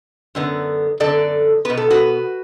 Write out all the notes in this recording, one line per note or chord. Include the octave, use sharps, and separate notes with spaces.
F#2 D3 B3
F#2 D3 B3 A4 D5
B2 B3 B4
A4
F#4 B4